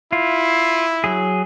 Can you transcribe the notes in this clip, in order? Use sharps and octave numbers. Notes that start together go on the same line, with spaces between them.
E4 F4
F#3 G#4